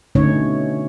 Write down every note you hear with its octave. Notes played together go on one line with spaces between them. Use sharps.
B2 D3 A3 C#4 D#4 C#5